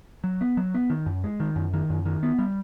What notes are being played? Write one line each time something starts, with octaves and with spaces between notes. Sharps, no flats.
F#3
B3
F#3
B3
D#3
F#2
G#3
D#3
F#2
D#3
F#2
D#3
B3
G3